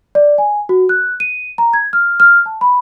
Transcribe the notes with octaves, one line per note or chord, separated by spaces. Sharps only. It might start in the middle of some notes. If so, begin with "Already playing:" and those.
D5
G#5
F#4
F#6
D#7
A#5
G#6
F6
F6
A5
B5